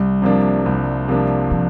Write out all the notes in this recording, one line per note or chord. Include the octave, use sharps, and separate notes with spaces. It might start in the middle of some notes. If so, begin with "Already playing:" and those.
Already playing: C2 G3
C3 F3 A#3 D4
C2
C3 F3 A#3 D4
F3